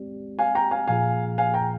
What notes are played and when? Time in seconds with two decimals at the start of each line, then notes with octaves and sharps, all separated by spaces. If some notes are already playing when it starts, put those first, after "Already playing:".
Already playing: G#3 C4 G4 D5
0.39 F5 G#5
0.55 G5 A#5
0.71 F5 G#5
0.88 A#2 F3 A#3 F4 G#4 F5 G#5
1.38 F5 G#5
1.54 G5 A#5